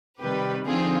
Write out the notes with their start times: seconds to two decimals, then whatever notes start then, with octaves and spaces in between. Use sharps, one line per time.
0.21 C3 D#3 G3 G4 B4
0.65 D3 F3 C4 D#4 F4 G#4